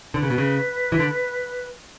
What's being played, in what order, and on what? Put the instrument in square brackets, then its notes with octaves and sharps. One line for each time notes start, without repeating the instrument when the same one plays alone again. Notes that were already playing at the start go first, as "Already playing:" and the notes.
[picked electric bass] D3 [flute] B4
[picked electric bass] C#3
B2
C#3
E3
D3